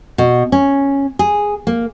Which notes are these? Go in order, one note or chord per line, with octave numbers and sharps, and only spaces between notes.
B2
C#4
G#4
A#3